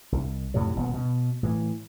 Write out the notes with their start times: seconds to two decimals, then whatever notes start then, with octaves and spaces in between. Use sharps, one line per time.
0.12 C2
0.54 F2 A2 C3 F#3
0.76 D#1 B2 A3 B3
0.94 B2
1.43 A2 E3